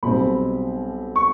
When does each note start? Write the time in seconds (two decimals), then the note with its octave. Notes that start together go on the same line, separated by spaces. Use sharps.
0.03 B1 B2 G3 C4 B5
1.16 C#6